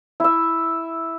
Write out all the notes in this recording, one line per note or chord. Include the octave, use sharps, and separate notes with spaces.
E4 E5